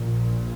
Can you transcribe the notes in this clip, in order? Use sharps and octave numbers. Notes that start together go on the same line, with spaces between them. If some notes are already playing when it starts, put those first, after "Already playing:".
Already playing: A#1 A#2